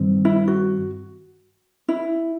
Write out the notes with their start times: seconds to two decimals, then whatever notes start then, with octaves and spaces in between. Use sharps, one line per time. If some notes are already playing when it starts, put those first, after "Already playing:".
Already playing: G2 D#3 G3 C4
0.25 E4
0.48 F#4
1.88 E4